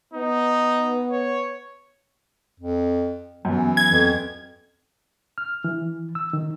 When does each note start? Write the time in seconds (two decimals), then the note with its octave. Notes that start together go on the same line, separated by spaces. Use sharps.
0.14 B3 D#4
1.11 C#5
2.60 F2
3.45 F#2 E3 B3
3.77 G#6
3.92 F2
5.38 F6
5.64 E3
6.15 E6
6.33 D#3